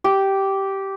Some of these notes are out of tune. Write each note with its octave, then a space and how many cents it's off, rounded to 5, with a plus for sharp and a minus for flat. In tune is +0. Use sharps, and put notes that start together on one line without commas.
G4 -10